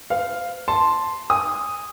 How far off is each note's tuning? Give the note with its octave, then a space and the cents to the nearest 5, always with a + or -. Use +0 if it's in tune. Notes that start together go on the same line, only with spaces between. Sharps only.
C5 -45 F5 +0
A5 +0 C6 +0
G#5 -20 D#6 +0